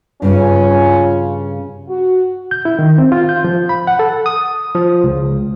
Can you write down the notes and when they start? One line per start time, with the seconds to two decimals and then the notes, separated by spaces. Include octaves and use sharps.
0.22 G2 C#3 C#4 F4
1.88 F#4
2.51 G6
2.65 E4
2.79 D#3
2.98 C4
3.12 F4
3.29 G6
3.44 F3
3.69 B5
3.87 F#5
3.99 A4
4.26 D#6
4.75 F3
5.04 C#2